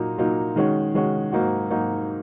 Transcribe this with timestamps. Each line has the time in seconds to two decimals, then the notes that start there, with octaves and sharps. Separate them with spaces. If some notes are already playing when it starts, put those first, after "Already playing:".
Already playing: A#2 F#3 A#3 D#4
0.18 A#2 F#3 A#3 D#4
0.56 D#3 G#3 C#4 F#4
0.94 D#3 G#3 C#4 F#4
1.32 G#2 F#3 A#3 D#4 F#4
1.71 G#2 F#3 A#3 D#4 F#4